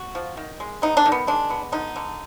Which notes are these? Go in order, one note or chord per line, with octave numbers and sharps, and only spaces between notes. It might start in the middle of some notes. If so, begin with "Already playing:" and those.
Already playing: F#4
F3
D#3
G#3
B3 D#4
D4
D#3
B3
G#3 D4
B3
D3 D#4
D3